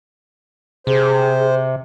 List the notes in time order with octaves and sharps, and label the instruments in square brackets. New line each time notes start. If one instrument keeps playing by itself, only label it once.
[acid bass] C3 [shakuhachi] G#4 [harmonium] C5